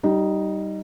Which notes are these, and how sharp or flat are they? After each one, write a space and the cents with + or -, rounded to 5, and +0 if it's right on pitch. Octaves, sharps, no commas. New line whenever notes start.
G3 -20 D#4 +0